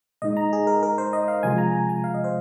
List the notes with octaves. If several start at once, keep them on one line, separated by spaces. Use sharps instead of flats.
A#2 G#3 D#4 D#5
A#5
G#4
A#4
A#4
C5
D#5
F5
C3 F3 G#3 F4 G#5
A#5
A#5
G#5
F5
D#5
C5